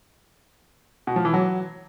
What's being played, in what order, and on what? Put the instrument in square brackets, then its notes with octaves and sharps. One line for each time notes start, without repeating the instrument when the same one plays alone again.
[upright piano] B2
F3
E3
F#3